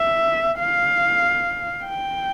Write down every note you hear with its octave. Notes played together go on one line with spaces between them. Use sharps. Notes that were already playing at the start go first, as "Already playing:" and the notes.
Already playing: E5
F5
G5